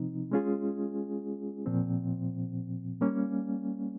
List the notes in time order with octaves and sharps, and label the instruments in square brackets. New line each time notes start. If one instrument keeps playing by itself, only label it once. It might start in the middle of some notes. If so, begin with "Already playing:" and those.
Already playing: [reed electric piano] C3 F3 C4 D#4
G#3 C#4 F4 G#4
A#2 F3 C4
G3 A#3 C#4